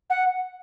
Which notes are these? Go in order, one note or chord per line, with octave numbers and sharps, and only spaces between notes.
F#5